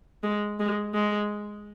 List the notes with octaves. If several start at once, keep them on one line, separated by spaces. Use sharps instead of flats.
G#3
G#3
G#3